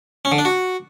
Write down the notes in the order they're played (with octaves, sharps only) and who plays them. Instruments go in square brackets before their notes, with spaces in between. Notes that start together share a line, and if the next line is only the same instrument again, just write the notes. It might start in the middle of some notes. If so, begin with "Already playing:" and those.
[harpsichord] C#4
D3
D4
F#4